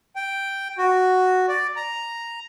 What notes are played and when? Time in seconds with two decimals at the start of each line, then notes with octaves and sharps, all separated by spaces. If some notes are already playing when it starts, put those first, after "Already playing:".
0.16 G5
0.78 F#4
1.49 D5
1.76 A#5